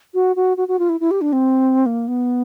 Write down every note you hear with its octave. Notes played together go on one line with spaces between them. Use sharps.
F#4
F#4
F#4
F#4
F4
E4
E4
G4
D4
C4
A#3
B3